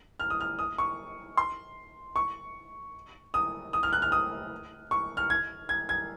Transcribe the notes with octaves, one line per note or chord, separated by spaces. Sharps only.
F6
D#6
F6
D#6
C#6
C6
C#6
D#6
D#6
F6
F#6
F6
D#6
C#6
F6
G#6
G#6
G#6